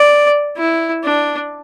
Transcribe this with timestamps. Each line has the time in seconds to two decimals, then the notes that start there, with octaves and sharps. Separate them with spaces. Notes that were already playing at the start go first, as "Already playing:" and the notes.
Already playing: D5
0.57 E4
1.04 D4